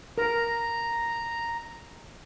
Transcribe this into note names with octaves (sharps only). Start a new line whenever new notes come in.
A#4 A#5